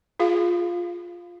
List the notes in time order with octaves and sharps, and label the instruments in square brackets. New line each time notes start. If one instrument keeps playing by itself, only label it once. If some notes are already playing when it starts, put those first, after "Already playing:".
[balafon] F4 G#4 F5